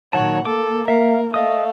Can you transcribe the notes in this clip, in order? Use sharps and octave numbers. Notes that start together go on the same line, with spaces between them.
A#2 D#3 F#3 C#5 F#5 A5
A#3 A4 D6
A#4 E5 F5
A3 D#5 F5 D#6